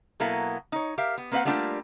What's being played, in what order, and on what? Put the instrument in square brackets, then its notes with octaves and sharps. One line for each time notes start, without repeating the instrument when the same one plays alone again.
[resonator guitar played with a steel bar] B2 F#3 A#3 B3 E4 A4
D#4 C#5
G4 A#4 E5 F5
B3
A#3 C4 B4 C#5 F5 F#5
G3 A3 A#3 D4 F4 G4